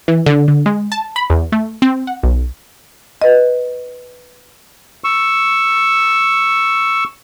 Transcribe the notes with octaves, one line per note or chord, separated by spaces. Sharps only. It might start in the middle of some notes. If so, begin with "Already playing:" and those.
E3
D3
D3
G#3
A5
B5
E2
A3
C4
F#5
B1
B4 D#5
C#6 E6